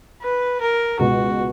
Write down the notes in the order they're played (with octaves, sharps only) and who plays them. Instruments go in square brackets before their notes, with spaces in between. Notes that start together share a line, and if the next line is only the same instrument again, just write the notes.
[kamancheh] B4
A#4
[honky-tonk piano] C#2 B2 G#3 [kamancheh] F#4